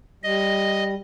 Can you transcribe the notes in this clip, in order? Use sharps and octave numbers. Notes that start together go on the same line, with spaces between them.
G3 D#5